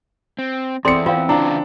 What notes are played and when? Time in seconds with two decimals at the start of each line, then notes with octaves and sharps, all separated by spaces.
0.39 C4
0.85 E2 C4 A4 D5 C6 C#7
1.06 C4 F4 F5
1.29 C#3 E3 D4 E4 F4